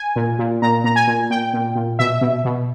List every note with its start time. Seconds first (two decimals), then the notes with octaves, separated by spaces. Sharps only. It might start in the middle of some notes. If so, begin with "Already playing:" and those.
Already playing: G#5
0.16 A#2
0.39 A#2
0.62 A#2 A#5
0.84 A#2 A#5
0.96 G#5
1.07 A#2
1.30 A#2 G5
1.54 A#2
1.75 A#2
1.99 B2 E5
2.21 B2
2.45 B2